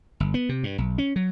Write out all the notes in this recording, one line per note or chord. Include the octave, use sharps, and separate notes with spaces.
G1
B3
C3
G2
B1
C#4
F#3